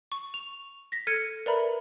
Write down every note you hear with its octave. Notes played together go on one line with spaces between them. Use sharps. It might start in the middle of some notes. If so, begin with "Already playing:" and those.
C#6
F7
A#6 B6
A4 F6 G#6 C#7 D#7
A#4 B4 D5 E5 A#5 B5